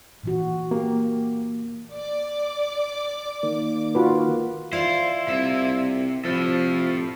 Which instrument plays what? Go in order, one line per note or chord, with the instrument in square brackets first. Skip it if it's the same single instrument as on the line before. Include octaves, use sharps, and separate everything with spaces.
[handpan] A#2 E3 F#4
[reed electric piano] A#3 [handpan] G4
[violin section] D5 D6
[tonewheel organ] D#3 A#3
[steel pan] F4 F#4 B4
[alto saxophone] E4 [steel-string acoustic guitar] F4 D5 F5 [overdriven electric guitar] C5
[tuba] C2 [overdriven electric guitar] C3 E5
[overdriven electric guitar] A2 A4 [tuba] C3 [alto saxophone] F3